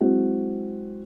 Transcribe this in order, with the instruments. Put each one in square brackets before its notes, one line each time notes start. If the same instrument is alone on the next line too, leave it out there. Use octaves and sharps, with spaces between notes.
[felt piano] F#3 G#3 C4 E4 F#4